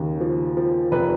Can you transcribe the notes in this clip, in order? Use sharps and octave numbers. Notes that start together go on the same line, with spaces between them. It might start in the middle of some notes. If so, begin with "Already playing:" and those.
Already playing: D#2 C#3
F3
F3
F1 B4